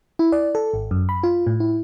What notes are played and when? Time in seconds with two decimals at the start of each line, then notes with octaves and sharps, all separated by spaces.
0.19 E4
0.32 D5
0.55 A4
0.74 G#1
0.91 F#2
1.09 B5
1.23 F4
1.47 A2
1.60 E4